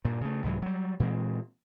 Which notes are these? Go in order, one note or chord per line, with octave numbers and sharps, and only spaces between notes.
G2 A#2
C#3 A3
C2 G#2 E3 F#3
F#3 G3
A#2 E3 G#3 C4